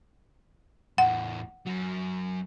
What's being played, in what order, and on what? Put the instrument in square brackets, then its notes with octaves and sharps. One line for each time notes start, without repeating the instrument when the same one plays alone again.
[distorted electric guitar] E2 A2 [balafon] F#5
[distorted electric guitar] F#2 F#3